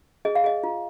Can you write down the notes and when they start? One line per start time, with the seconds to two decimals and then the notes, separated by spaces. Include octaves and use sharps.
0.25 G#4 D#5
0.35 F5
0.44 G#4 D#5
0.63 F4